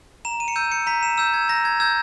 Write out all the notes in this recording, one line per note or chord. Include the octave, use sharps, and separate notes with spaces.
A#5 E7
D#7
C#7
E6 G6 D#7
C#7
A#5 B6
E7
E6 G6 E7
G#6
A#5 A#6
G#6
E6 G6 G#6